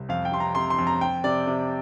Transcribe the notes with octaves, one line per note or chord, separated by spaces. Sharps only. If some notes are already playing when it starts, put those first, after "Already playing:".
Already playing: C2
F2 F5
G5
C3 C6
A#5
C3 C6
C6
F2
A#5
F2 G5
C3 D5
C3